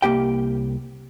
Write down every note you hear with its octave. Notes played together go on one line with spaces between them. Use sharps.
C2 A#3 G4 G5